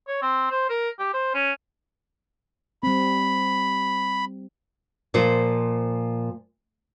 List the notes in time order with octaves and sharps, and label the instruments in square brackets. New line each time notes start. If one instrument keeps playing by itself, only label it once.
[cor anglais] C#5
C4
C5
A#4
G4
C5
C#4
[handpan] G3 C4 [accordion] B5
[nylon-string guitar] A#2 F3 C5